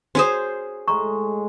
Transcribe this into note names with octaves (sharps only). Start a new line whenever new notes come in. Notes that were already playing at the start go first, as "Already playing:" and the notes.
C#4 F#4 G#4 C5 D#6
A2 G#3 D#5 A#5 C#6